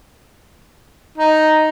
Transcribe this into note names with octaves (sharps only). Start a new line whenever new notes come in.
D#4